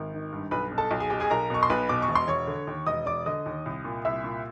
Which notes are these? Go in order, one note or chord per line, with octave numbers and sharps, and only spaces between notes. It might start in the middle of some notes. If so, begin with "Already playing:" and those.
Already playing: G#1 A#4
D#3
G2
B1 B4 B5
B2
A4 A5
B1
G#4 G#5
B2 G4 G5
G#4 G#5
B1 A#4 A#5
B2 C#6
C6
B1 B4 B5
B2 D6
C#6
E1
C6
E1 C#5 C#6
D3
D#2
E1 D#5 D#6
E1 D5 D6
D3 D#5 D#6
D#2
C2
A#2
C2 E5 E6
A#2